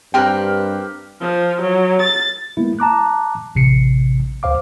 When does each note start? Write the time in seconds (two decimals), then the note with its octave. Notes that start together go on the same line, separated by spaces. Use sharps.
0.14 G2 C4 G4 A#4 G5 C6 F6 F#6
1.20 F3
1.60 F#3
2.00 A6
2.57 G#3 A#3 B3 E4
2.79 A5 A#5 D6 F#6
3.55 A1 C3 C7 C#7
4.43 D2 C5 F5 D6